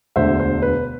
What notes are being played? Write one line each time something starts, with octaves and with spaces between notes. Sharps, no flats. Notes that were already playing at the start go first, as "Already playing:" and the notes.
E1 D2 D3 C5 E5
C5
B4